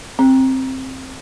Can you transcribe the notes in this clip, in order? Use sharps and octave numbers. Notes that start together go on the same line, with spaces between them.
C4